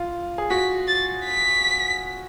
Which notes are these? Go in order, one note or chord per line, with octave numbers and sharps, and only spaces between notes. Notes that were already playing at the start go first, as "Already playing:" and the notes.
Already playing: F4
G#4
F#4 B6
A6
B6